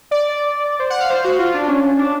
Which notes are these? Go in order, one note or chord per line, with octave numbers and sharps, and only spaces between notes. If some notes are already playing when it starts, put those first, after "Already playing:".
D5
C5
F#5
F5
C5
F#4
F4
D4
C#4
C#4
D4